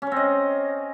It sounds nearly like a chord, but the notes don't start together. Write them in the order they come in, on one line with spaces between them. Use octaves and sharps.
C#4 C#5 C4 D#5